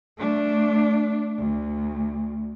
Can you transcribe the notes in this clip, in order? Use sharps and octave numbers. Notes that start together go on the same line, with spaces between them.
A3 D4
D2